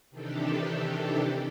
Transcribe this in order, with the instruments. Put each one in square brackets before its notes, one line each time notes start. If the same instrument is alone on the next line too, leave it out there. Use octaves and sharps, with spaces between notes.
[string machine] C3 D#3 E3 D4 G4 A4